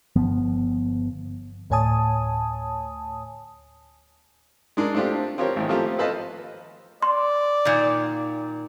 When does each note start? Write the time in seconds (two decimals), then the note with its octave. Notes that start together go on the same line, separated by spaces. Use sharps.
0.16 G1 F3 B3
1.70 D2 A2 C#5 G#5 A5 D#6
4.77 G#3 D4 A#4
4.94 A3 C4 D4 F4 G4
5.38 C4 F4 G4 A#4 C#5
5.56 A1 D#3
5.69 F3 A3 A#3 C4 F4 G4
5.99 A4 B4 C5 D#5 F5 A5
7.02 D5 C6
7.65 A#2 D#3